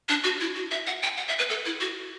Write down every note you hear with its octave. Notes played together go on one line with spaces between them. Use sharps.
D4
F#4
E4
F#4
E5
F#5
G5
F#5
E5
B4
A4
E4
F#4